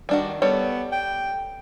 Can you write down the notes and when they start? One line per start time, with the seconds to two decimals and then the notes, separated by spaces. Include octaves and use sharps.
0.09 D#3 G3 D4 F#4
0.42 G3 B3 A4 C#5
0.92 G5